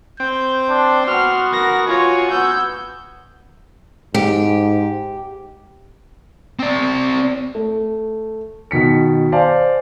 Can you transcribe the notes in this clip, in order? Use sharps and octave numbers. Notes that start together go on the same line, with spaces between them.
C4 G5 G6
D4 C6
B3 F#4 F6
A#4 A#6
F4 C#5 G#5
B3 E6 G6
G#2 G4
C4 D5
A3
B2 D#3 B6 C#7
C5 D5 F5 G#5 A5